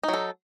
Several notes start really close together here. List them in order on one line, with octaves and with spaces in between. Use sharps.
D#4 F#3 A4